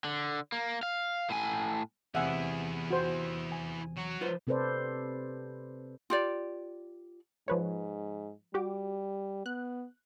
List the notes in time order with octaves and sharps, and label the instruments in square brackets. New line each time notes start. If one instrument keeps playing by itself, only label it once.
[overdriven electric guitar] D3
A#3
F5
A2 G#5
[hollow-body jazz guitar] E2 C3 [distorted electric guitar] E4 G#4 [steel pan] E5 F#5 G#5
[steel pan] F#4 C5
G#5
[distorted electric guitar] F#3 F#4
[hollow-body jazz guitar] F4 B4 C5
[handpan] C3 C4 A4 B4 C5 D5
[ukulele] F4 G4 D5
[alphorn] G#2 [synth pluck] F3 B4 C#5
[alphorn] G3 [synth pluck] F#4 G4 D6
[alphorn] B3 [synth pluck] F#6